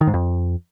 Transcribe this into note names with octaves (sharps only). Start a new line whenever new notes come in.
D#3
G#2
F2